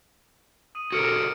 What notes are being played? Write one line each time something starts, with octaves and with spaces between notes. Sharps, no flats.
D#6 D#7
F#4 A4 A#4 F6 C#7 D7